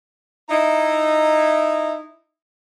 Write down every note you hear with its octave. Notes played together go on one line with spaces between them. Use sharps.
D#4 E4